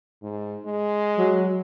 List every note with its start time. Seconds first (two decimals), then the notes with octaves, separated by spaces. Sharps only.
0.22 G#2
0.65 G#3
1.18 F#3